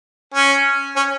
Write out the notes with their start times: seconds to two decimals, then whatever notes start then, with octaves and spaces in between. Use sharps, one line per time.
0.34 C#4
0.96 C#4